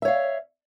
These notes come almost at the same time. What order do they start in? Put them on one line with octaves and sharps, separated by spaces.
E5 C#5 F5